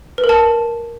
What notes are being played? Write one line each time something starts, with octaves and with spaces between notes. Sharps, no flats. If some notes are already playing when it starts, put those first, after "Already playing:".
B4
A#4
A5